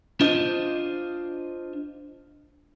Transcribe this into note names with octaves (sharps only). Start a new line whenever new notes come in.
D4 F4 C5 D#5